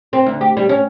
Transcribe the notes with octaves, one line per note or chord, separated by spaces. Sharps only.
C4
D2
G4
G3
C#4